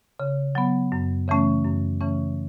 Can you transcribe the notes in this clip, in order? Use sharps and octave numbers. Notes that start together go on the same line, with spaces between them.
C#3
F#3 B3
F#2
C#3 E3 A3 C#4
F#2
C#3 E3 A3 C#4